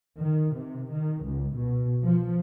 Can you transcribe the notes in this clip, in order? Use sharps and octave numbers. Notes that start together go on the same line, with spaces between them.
D#3
C3
D#3
C#2
B2
F3